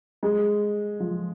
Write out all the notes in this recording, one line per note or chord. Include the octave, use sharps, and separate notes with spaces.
G#3
F3